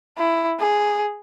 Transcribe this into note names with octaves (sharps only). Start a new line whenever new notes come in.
E4
G#4